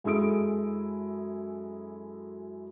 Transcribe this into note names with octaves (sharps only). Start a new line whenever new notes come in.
F#2 G#3 E4 A4 D#6 D7